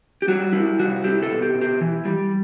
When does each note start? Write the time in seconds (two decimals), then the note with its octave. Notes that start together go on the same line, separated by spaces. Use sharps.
0.22 G4
0.28 G3 F#4
0.53 G3 E4
0.79 C3 F#4
1.04 E4 G4
1.23 A4
1.30 B2
1.42 G4
1.55 B2
1.61 G4
1.81 E3
2.05 G3